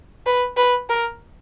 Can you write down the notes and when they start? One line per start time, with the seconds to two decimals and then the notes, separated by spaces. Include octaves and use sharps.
0.26 B4
0.57 B4
0.89 A#4